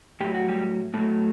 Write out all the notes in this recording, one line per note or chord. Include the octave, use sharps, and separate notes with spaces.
A2 F#3 G4
F#4
G3 G4
A2 F#3 A3